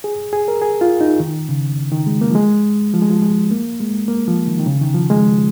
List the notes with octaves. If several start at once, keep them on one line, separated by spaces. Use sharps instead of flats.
G#4
G#4
A#4
G#4
F4
D#4
D#3
C#3
D#3
G#3
A#3
F3
G#3
F3
G#3
F3
G#3
A#3
G#3
A#3
F3
D#3
D#3
C#3
D#3
F3
G#3